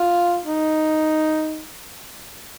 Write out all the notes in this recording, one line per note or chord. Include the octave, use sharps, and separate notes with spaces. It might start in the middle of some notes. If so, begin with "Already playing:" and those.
Already playing: F4
D#4